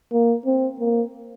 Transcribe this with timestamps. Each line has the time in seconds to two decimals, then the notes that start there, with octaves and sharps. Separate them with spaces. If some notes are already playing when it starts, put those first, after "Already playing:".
0.13 A#3
0.46 C4
0.79 A#3